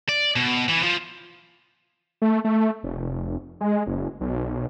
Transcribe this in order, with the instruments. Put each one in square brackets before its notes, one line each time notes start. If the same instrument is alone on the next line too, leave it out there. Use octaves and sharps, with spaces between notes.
[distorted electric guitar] D5
B2
E3
F3
[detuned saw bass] A3
A3
F1
G#3
F#1
B1